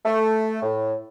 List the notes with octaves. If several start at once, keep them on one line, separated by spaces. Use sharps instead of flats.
A3
A2